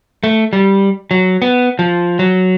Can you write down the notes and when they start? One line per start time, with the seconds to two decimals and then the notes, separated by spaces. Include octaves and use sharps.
0.24 A3
0.53 G3
1.11 F#3
1.42 B3
1.79 F3
2.19 F#3